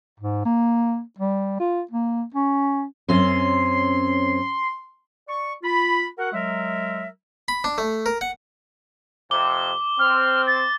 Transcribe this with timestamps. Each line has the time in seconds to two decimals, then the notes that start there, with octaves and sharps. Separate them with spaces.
0.20 G#2
0.45 A#3
1.19 G3
1.60 F4
1.91 A#3
2.34 C#4
3.08 F#2 C4 C#4 C6
5.28 D5 C#6
5.63 F4 B5
6.19 F#4 A#4 F#5
6.33 F#3 G#3 A#4 E5
7.48 B5
7.64 D4
7.78 A3
8.06 A#4
8.21 F#5
9.31 F2 C3 D6 G7
9.99 C4 F6
10.47 A6